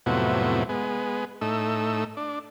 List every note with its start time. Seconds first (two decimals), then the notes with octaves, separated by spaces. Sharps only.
0.06 F2 A2 C3 F#3 B3 E4
0.69 G#3 B3
1.41 A2 A3 D#4 E6
2.17 D4